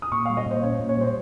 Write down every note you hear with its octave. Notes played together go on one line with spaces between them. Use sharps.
D#6
A#2 C#6
G3 F5
D#5
A#2 C5
C#4 C#5
A#2
C#5
G3 C5